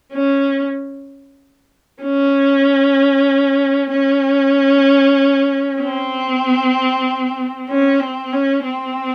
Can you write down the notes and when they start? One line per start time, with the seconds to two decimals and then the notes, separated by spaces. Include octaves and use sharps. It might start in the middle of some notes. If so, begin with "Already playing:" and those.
0.13 C#4
2.03 C#4
3.91 C#4
5.80 C4
7.70 C#4
8.00 C4
8.33 C#4
8.64 C4